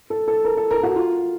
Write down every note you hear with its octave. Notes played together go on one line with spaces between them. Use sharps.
A4
A4
A#4
A4
A#4
F#4
F4